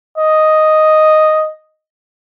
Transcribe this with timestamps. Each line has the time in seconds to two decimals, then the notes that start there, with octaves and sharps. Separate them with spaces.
0.18 D#5